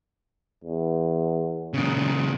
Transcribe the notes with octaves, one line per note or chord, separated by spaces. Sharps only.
E2
A#2 C#3